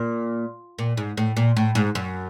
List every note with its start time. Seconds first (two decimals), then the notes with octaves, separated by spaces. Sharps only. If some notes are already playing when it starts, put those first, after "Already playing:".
Already playing: A#2
0.79 A#2
0.97 G#2
1.17 A2
1.37 A#2
1.57 A2
1.75 G#2
1.95 F#2